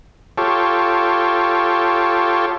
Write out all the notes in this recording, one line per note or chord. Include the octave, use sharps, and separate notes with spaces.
F4 G4 A4 C#5